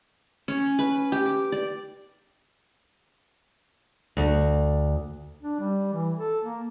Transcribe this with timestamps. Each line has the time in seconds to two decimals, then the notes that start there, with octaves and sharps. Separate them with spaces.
0.48 C#4
0.79 B4
1.12 G4
1.26 D6
1.52 D5
4.17 D2
5.43 D4
5.60 G3
5.93 E3
6.17 A4
6.44 A#3